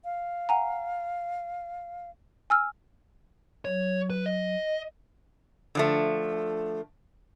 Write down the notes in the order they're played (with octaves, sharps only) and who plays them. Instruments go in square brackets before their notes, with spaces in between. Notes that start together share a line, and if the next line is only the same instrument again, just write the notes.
[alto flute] F5
[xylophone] F#5 G#5 A#5
G#5 E6 F6
[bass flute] F#3 [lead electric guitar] C#5
[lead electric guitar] B4
D#5
[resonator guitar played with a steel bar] D3 F3 A3